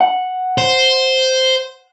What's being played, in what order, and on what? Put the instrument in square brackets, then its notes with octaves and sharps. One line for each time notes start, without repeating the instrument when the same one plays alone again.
[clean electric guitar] F#5
[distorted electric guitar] C5